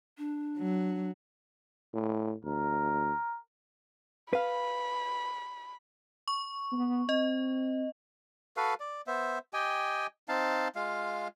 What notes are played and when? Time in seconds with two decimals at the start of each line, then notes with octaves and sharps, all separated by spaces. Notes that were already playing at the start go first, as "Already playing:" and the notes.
0.18 D4
0.58 F#3
1.94 A2
2.45 D2 A#4
4.33 B4 F5 B5
6.28 C#6
6.72 B3
7.09 C4 D#5
8.57 F#4 A4 B4 F5
8.80 D5
9.07 B3 C5 E5
9.53 G4 D#5 G5 G#5
10.29 C4 D#4 F5 A5
10.76 G#3 F4 F5